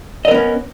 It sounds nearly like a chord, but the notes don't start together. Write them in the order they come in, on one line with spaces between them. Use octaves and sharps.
D#5 A#4 B3 C#4